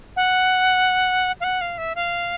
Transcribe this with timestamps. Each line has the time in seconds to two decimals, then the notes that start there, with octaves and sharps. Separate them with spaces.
0.16 F#5
1.40 F5
1.44 F#5
1.61 F5
1.78 E5
1.95 F5